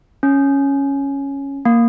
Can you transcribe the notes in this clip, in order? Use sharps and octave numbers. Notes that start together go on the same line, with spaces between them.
C#4
A#3